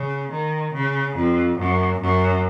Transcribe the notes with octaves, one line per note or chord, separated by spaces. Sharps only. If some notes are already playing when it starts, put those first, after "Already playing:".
Already playing: C#3
D#3
C#3
F2
F#2
F#2